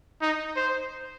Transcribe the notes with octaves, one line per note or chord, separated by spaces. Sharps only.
D#4
C5